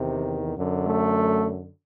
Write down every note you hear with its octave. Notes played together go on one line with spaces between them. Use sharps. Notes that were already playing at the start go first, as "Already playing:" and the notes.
Already playing: E2 C3 D#3
F#2 D3
A3